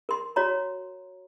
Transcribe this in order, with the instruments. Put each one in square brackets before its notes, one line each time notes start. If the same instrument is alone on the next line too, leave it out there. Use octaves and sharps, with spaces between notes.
[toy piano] A#4 C6
F#4 C#5 A#5